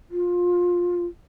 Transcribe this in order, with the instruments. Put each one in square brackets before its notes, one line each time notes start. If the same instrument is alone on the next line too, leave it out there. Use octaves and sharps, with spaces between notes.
[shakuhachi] F4